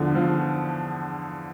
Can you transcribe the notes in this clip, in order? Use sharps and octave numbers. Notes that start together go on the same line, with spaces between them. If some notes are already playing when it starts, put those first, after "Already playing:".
Already playing: E2 D3 F3
F3